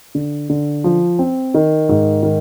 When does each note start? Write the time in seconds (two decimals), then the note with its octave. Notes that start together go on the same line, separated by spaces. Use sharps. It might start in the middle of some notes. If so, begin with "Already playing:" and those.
0.15 D3
0.49 D3
0.84 F3
1.19 C4
1.54 D#3
1.89 G#2
2.23 D#3